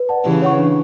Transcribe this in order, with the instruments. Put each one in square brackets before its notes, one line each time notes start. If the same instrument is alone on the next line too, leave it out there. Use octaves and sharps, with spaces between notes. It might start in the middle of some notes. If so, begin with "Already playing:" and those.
Already playing: [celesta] B4
D5 F#5 A5
[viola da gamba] C#3 E3 [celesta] G4
[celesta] C#5 F#5 C#6
D4